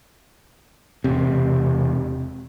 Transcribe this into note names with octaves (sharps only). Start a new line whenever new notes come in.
E1 C3